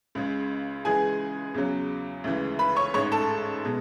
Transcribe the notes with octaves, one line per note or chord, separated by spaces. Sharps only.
C#2 C#3 G#3
C#2 C#3 E3 G#3 G#4 G#5
E2 C#3 F#3
D2 C#3 E3 G#3
B4 B5
C#5 C#6
A1 G#2 G#3 C#5 C#6
A4 A5
B2 G#3